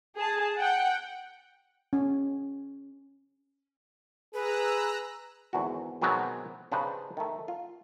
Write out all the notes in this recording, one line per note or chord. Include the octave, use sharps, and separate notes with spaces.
G#4 A5
F#5 G5
C#4
G#4 B4 A#5 E6 F#6
G#1 E2 D3 F#4
B2 D#3 F#3 G#3 B3 C4
C#3 D4 D#4 G4 B4 C5
D#3 A3
F4